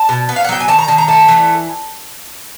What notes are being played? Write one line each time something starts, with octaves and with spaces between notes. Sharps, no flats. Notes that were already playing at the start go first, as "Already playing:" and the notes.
Already playing: A5
B2
B3
F5
F#5
F#3 G5
G#5
D#3 A5
A#5
D#3 A5
A#5
A3 A5
E3